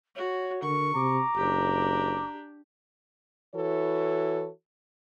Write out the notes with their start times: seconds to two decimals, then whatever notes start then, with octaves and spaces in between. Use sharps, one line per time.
0.15 F#4 C#5
0.63 D3 A#4 C#6
0.95 C3 A#5 D6
1.37 F#1 D4 G4
3.54 E3 E4 F#4 A4 C#5